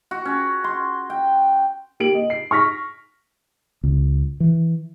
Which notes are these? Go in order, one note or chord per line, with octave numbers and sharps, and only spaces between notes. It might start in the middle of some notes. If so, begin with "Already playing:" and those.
F#4
C#4
C6
G5
A#3 G4 D7 F#7
D#5
C7
C#6 F6 A#6 B6
C#2
E3